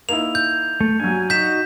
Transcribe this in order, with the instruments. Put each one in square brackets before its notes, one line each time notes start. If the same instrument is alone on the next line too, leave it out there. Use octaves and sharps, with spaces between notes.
[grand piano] A#3 D#4 E4 [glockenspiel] F7
[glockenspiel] G6
[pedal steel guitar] A3
[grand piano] G2 F#3 [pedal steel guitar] G#5
[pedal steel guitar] D#4 F#4 [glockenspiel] G6 B6 E7